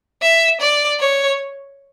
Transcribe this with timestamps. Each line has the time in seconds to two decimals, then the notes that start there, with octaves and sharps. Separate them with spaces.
0.22 E5
0.61 D5
1.00 C#5